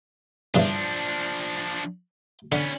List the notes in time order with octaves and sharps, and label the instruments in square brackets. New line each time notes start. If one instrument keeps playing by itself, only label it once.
[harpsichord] G2 C#3 E3 [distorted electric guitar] F3 D4
[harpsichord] D3 [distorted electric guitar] B3 C#4